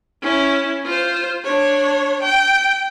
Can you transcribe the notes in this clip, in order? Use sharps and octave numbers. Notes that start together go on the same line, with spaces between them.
C#4 E4
F4 C5
D4 C#5
G5